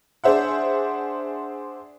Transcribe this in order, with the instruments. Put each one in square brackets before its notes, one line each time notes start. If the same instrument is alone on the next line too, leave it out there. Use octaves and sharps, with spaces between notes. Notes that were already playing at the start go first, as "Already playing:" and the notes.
[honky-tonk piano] D4 G#4 C5 E5 F#5